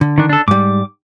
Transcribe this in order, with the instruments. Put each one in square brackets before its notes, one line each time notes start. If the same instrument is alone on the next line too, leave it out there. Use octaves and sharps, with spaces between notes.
[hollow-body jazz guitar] D3
[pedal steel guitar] D#3 D4
D4 A4
[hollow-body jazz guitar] G#2 G3 [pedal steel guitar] D6